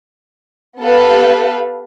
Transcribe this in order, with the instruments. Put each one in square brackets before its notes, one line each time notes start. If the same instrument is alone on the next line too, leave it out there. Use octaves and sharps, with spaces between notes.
[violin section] B3 G4 A4 B4 F5